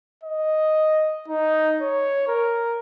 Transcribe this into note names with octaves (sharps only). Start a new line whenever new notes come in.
D#5
D#4
C#5
A#4